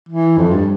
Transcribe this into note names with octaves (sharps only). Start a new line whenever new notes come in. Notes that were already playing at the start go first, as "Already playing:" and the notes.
E3
F2
G2